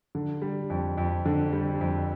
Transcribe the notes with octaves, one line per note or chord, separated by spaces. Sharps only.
D3
G3
F2
F2
D3
G3
F2